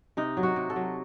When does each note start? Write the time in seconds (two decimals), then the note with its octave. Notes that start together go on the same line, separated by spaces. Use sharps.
0.17 C3 D#4
0.37 F#3
0.43 F#4
0.56 C3
0.70 A4
0.76 F#3